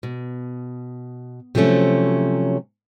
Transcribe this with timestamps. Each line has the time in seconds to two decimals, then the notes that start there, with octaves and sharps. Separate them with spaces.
0.03 B2
1.55 C3 F3 F#3 A3 C#4